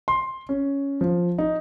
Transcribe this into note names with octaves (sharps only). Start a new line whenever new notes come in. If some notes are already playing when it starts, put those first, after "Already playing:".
C6
C#4
F3
D#4